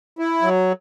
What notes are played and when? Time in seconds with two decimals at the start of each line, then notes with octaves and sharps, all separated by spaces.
0.19 E4
0.42 F#3